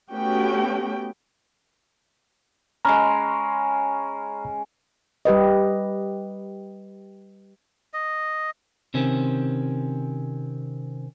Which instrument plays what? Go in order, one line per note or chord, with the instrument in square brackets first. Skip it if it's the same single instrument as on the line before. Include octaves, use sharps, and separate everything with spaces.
[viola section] A3 B3 C#4 F#4 G4 G5
[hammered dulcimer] G#3 C#4 [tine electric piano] A#5 B5 F6
[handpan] G3 G4 B4 D#5
[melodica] D#5
[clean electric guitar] C3 D#3 C4 C#4